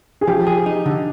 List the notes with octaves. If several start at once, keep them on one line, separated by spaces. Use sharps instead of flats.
G#4
F3 G4
G#4
D#4
D3